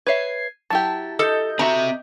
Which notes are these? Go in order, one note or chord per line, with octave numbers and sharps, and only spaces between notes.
B4 C#5 E5 G#6 C7
F#3 E4 G4 A5
A4 D#5 G6
C4 F#4 E5 A#5